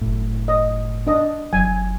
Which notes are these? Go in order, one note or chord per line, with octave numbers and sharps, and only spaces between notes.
F#1 A2
D#5
D4 D#5
F#1 F#3 G#5